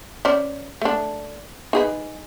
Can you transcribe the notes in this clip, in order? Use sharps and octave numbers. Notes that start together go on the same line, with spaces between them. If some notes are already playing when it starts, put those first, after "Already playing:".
C#4 C5 D5
A3 D4
D#4 G#4 B4